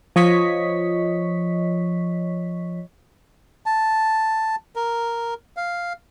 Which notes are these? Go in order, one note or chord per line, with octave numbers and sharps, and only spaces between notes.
F3 C#5 D#5 C#6 B6
A5
A#4
F5